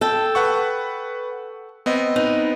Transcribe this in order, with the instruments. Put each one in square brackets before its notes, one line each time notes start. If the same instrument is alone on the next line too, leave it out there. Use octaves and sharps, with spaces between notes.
[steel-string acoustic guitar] A4 G5
[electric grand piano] B4 F#5 C#6
B3 C4 D#5
[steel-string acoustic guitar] D#4 B4